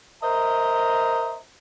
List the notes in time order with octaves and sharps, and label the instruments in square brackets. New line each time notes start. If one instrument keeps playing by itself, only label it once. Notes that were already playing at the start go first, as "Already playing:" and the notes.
[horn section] A#4 C5 D#5 E5 A#5